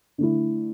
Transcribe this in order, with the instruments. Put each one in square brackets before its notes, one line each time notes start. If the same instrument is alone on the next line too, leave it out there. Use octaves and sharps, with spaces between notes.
[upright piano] D3 A3 E4